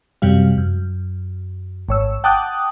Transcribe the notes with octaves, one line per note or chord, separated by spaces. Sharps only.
F#2 C3 G3 F5
F#2
G#1 C#5 E6
F#5 G5 A5 D6 D#6 F#6